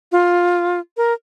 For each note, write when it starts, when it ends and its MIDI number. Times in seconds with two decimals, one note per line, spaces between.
0.12 0.80 65
0.97 1.13 70